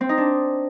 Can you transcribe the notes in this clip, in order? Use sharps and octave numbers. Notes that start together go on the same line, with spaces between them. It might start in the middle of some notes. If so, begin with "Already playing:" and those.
C4
D#4
D4